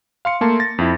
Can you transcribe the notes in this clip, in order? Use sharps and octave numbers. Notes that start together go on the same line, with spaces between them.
F5 C6 C#7
A3 A#3 A5 C6
A6 A#6
F2 E4